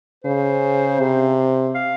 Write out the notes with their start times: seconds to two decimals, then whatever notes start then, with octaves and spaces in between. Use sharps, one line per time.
0.24 C#3 C5
1.00 C3
1.75 F5